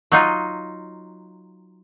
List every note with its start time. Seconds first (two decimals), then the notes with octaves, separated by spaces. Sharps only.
0.12 F#3 D#4 F4